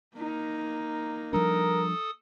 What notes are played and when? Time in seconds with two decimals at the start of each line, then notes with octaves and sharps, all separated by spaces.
0.17 A#3 D#4
1.33 F3 G3 D4 A4 A#4 D#6